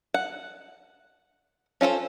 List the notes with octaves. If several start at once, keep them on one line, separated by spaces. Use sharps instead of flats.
F#5
C#4 F4 A4 C5